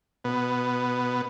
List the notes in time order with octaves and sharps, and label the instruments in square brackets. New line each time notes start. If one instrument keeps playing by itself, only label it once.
[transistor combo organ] B2 B3